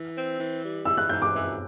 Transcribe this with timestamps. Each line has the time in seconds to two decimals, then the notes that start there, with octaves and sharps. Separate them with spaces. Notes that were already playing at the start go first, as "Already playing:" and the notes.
Already playing: E3
0.16 C4
0.38 E3
0.63 G3
0.85 E3 E6
0.97 F#6
1.09 G#2 G6
1.22 D6
1.34 E3